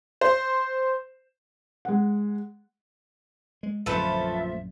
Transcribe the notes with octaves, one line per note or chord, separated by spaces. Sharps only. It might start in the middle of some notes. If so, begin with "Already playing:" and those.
C5
G#3 F#5
G#3
A#1 F#2 D3 F3 A3 A4 B4 E5